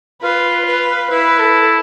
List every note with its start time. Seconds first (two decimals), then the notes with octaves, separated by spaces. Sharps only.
0.22 F4 B4
0.67 B4
1.11 E4 B4
1.40 A4